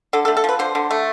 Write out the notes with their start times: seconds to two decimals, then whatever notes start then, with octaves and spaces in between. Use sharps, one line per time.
0.13 D3 A4
0.25 A4
0.28 A3
0.37 A4
0.44 F3 B4
0.59 D3 C5
0.75 D3
0.91 A3